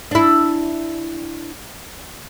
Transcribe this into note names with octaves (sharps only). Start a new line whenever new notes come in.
D4 E4